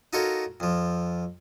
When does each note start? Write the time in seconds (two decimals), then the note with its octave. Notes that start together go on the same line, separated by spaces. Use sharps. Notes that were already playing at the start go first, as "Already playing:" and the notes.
0.13 D#4 F4 F#4 A4 A#4 C#5
0.60 F2 F3